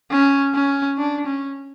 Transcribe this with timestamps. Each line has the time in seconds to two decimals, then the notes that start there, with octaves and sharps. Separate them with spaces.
0.11 C#4
0.54 C#4
0.98 D4
1.27 C#4